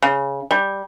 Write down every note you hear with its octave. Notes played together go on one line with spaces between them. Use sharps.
C#3
G3